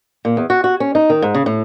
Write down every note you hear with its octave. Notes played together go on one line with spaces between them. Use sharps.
A#2
E2
F#4
F#4
C#4
D#4
D#3
G#2
C#3
A2